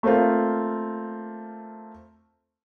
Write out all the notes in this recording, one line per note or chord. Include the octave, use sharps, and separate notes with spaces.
A3 A#3 C4 F4